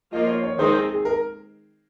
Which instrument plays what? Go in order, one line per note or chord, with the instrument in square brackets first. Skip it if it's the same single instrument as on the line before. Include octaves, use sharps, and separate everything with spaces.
[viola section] F3 A#3 F4 [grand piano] D#5
[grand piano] C#5
C#5
[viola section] D#3 G#3 C4 D#4 [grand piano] C5
[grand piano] G#4
G#4
A#4